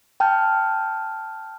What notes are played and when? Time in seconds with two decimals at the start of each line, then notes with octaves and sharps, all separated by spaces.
0.20 G5 A5 F6 G6